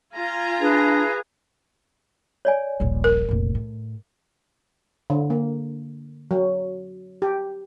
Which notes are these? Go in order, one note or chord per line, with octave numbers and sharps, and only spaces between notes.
F4 G#5 A#5
D4 G#4 B4
C#5 D5 G#5
D#1 A#1
A#4
F1 A#1
A2
D3
A#3
F#3
G4